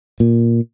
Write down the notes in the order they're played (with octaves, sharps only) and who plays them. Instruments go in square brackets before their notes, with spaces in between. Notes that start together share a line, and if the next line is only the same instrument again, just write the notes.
[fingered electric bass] A#2